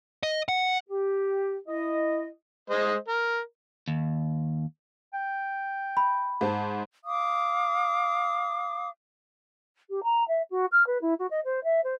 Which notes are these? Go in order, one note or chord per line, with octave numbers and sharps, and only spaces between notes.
D#5
F#5
G4
E4 D#5
G#3 C5 D#5
A#4
D#2
G5
B5
G#2 C5 A5
F5 D6 D#6
G4
A#5
E5
F#4
F6
B4
E4
F#4
D#5
C5
E5
C5